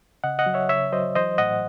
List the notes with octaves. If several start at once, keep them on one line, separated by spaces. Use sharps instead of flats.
C#3 D#5 F#5
D#5 F#5
F#3
C#5 E5
C#3 C#5 E5
F#3 C5 D#5
E3 C5 D#5
A2 D#5 F#5